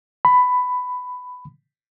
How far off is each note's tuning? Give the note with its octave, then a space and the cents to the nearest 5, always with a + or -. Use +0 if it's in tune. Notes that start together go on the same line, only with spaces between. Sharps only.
B5 +10